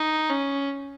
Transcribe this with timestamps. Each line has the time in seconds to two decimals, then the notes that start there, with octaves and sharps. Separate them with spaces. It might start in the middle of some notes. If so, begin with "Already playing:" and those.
Already playing: D#4
0.29 C#4